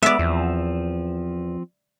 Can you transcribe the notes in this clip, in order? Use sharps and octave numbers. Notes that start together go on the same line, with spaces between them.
G#3 B3 D5 E5
E2 F3 C4